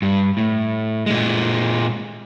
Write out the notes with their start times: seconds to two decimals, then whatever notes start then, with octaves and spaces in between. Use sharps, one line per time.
0.02 G2
0.37 A2
1.06 A#2 G#3